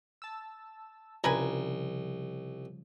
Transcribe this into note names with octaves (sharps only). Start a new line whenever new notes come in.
A5 E6
C2 C#3 F3 G3 A#4 B4 G#5